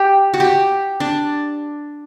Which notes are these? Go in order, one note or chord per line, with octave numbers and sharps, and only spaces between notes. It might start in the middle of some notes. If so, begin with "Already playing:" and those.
Already playing: G4
F#4
G4
D4